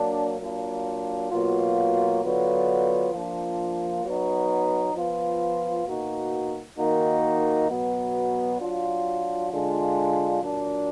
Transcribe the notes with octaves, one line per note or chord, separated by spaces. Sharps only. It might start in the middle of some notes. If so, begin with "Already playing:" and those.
Already playing: F#3 A#3 D4
F#3 A#3 D4 F4
B2 F#3 A#3 F4
D3 F#3 B3 F4
F3 A#3 D4 F4
F#3 B3 D#4
F3 B3 F4
B2 A#3 D#4 F#4
D#3 A#3 D#4 F#4
B2 F#3 B3
F#3 D4 F4
D3 G#3 D4 F4
A#2 F#3 D4